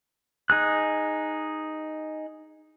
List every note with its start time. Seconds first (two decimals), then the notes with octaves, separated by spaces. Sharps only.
0.50 D#4 G#4 F#6